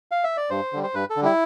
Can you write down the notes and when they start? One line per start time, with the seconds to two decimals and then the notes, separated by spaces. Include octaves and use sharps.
0.11 F5
0.24 E5
0.37 D5
0.50 G2 C5
0.73 D3 G3
0.83 C5
0.94 G2 B4
1.10 A4
1.16 D3
1.22 G3 E4